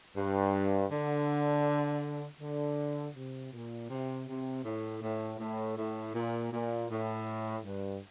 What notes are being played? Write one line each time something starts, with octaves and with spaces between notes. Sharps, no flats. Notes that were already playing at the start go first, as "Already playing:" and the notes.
G2
D3
D3
C3
A#2
C3
C3
A2
A2
A2
A2
A#2
A#2
A2
G2